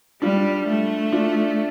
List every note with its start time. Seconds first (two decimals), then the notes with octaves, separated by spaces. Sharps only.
0.22 G3 D4 F4
0.68 A3
1.12 D4 F4